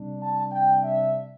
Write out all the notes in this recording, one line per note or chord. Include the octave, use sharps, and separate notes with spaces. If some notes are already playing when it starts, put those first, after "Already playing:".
Already playing: C3 G3 D4
A5
G5
E5